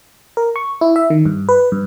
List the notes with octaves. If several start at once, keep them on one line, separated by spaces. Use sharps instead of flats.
A#4
C#6
E4
E5
D#3
G2
B4
G2